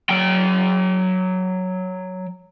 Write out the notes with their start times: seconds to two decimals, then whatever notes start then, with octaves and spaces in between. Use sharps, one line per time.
0.10 F#3 G5